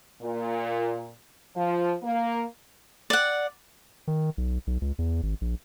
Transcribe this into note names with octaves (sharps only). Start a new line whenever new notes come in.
A#2
F3
A#3
D5 F#5
D#3
B1
B1
C#2
E2
G#1
A#1